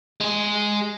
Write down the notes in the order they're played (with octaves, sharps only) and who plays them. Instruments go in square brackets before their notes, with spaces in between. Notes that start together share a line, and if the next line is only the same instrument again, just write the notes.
[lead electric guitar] G#3 G#4